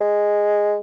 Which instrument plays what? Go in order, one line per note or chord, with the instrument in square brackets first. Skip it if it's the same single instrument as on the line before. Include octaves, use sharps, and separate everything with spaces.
[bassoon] G#3